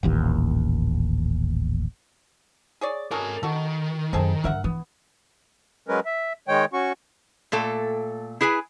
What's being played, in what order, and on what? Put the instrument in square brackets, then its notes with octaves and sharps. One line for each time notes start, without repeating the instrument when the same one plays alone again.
[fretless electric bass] D#1 A1 D#2
[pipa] G#4 C#5 D5
[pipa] G#3 C#4 A4 [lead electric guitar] A#4 G#5
[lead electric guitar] D#3 [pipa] F#4 A4
[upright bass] F#2 [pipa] C4 G#4 A4
[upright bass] G2 D3 [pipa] A#4 E5 F#5
[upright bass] E3 [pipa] B3
[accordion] F#3 G#3 C#4 A#4 B4
E5
D#3 G#3 C#5 G5
C#4 F#4 C#6
[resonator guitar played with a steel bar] A#2 A3 A4 G5
E4 G#4 B4 G#5